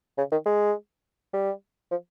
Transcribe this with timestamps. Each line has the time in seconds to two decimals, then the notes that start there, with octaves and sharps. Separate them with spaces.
0.18 C#3
0.32 D#3
0.46 G#3
1.33 G3
1.91 F3